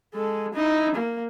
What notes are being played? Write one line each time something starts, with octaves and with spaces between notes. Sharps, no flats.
G#3 A4
D#4 E4
A#3